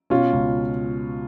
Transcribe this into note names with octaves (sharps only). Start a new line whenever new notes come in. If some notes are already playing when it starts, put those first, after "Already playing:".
B2 C#4 F4
C#2